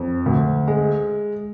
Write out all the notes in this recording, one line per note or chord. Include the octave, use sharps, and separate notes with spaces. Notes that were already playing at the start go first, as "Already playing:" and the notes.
Already playing: F2
D2
G#3